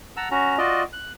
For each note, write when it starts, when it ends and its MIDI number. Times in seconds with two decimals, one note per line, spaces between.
0.17 0.29 78
0.17 0.29 81
0.17 0.29 82
0.17 0.29 88
0.31 0.58 61
0.31 0.58 66
0.31 0.58 82
0.58 0.83 65
0.58 0.83 66
0.58 0.83 74
0.58 0.83 75
0.93 1.12 90